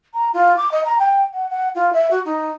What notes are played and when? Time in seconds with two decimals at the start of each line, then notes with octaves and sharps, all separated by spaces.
0.14 A#5
0.33 F4
0.57 D6
0.72 D#5
0.85 A#5
0.99 G5
1.34 F#5
1.50 F#5
1.75 F4
1.93 E5
2.11 F#4
2.25 D#4